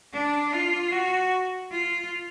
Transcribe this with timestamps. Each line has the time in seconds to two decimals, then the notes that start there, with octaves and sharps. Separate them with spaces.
0.13 D4
0.53 F4
0.91 F#4
1.71 F4